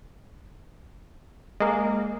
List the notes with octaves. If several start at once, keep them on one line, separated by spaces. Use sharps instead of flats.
G#3 A#3